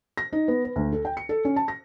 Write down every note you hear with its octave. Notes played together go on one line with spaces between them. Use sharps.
A#6
D#4
B3
B4
D2
A4
G5
C#7
A4
C#4
A5
A#6